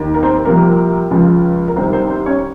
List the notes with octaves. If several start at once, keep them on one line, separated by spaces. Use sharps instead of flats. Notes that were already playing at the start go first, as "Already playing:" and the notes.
Already playing: D#2 D#3
A#4
C4 C5
C2 C3 F3 A#3 A#4
C#2 C#3 F3
A#4
C2 C3 D#3 C4 C5
C4 C5
C4 C5
C#4 C#5